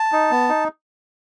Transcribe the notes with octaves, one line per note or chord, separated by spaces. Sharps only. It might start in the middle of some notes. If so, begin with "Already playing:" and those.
Already playing: A5
D#4
B3
D#4